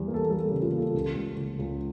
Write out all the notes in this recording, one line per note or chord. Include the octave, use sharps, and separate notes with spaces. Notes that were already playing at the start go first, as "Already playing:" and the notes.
Already playing: E2 G3
A#3
A4
G3 A4
G4
C#3
F4
A#3
A4
C#2 A4
C#2
C#3
C#2